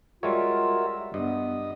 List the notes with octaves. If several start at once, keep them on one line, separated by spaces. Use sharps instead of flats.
G3 G#3 F4 F#4 A#4 C#5 E5
G2 B3 D#5